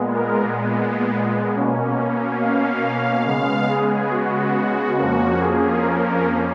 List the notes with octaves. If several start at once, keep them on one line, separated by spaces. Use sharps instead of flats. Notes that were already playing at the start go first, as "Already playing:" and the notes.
Already playing: A#2 G#3 B3
A#4
B2 A#3 C#4
F5
C#3 G#3 B3 F5
G#4
F#4
F2 F3 A#3 C#4 F#4
G#4
A#4